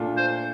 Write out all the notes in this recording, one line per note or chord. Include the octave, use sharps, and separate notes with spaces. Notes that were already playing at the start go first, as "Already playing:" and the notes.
Already playing: A#2 A3 D4 F4
C5